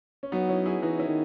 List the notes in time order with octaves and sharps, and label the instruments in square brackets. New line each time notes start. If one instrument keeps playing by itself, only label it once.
[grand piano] C#4
[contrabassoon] F#3 [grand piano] B3 D#4
[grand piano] C#4 E4
E4 G#4
[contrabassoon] E3 [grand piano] D#4 F#4
[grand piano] C#4 E4
[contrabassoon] D#3